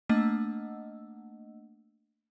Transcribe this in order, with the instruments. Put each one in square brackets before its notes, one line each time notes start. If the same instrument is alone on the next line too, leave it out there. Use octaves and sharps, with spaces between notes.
[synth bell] A3 A#3 D4 D#5 F#5 E6